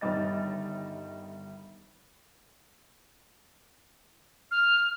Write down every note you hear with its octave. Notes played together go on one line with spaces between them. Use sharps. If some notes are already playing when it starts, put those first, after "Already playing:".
G1 D#3 G3 D#5 A6
F6